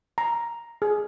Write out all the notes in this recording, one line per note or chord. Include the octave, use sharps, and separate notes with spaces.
A#5
G#4